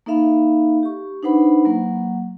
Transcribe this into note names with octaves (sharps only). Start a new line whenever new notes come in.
A#3 D#4 A4 E5 F5 B5
G4 C#6
D4 D#4 B4 C5 F#5 B5
F#3 A#3 F#5